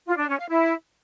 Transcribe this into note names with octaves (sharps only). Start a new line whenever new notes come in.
F4
D4
C#4
F5
E4